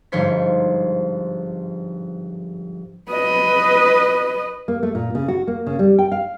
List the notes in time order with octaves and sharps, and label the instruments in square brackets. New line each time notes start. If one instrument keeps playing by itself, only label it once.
[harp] G1 G#2 F3 C5 C#5 B6
[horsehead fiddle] B4 D#5
[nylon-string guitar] A#3
A3
A#2
C#3
F#4
A#3
C#3
G3
G5
F5